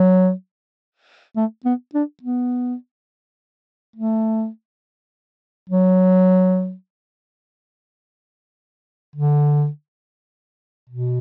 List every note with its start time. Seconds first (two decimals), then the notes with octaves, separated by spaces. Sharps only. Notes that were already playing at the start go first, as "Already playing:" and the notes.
Already playing: F#3
1.36 A3
1.65 B3
1.94 D4
2.23 B3
3.96 A3
5.70 F#3
9.16 D3
10.90 B2